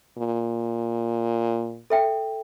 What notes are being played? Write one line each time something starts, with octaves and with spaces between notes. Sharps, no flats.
A#2
A4 E5 G5